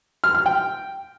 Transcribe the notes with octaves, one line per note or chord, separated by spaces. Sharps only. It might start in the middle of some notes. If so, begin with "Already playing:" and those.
F6
F6
G5